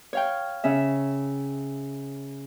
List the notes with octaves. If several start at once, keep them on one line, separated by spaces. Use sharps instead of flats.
C#5 F5 G5
C#3 C#4 E5